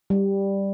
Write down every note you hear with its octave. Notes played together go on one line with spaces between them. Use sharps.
G3